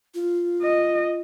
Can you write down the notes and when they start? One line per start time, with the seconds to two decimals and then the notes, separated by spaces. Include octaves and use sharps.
0.14 F4
0.62 D#5